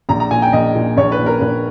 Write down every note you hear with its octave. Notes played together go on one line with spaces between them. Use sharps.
A#1 A#5
A#5
A#2 G#5
G5
A#1 D#5
A#2
A#1 C#5
B4
A#2
A#4
A#1 B4